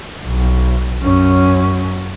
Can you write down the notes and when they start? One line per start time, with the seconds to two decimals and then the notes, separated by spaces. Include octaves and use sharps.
0.24 B1
1.03 F#2 C#4